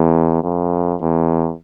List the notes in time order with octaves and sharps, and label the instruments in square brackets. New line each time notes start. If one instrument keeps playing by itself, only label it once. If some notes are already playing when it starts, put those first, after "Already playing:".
Already playing: [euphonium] E2
F2
E2